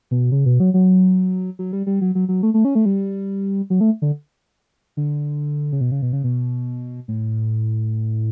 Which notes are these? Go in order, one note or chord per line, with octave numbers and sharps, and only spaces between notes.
B2
C#3
B2
F#3
F#3
F#3
G3
G3
F#3
F#3
F#3
A3
A3
C#4
A3
G3
F#3
A3
D3
D3
C#3
B2
C#3
B2
C#3
B2
A2